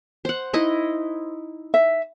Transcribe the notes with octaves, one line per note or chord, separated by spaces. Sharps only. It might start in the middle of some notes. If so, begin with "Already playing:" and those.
C5 F#5
D#4 E4 D#5
E5